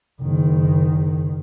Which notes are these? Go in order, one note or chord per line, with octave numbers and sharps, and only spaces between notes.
F#1 D#3